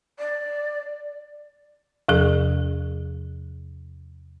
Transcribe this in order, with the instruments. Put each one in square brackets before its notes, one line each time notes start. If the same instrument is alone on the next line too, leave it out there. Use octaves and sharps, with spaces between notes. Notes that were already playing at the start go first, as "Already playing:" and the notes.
[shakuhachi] D5
[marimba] E2 C3 F3 G#4